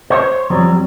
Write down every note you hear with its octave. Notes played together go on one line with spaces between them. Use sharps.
C5 C#5
F2 F#3 G3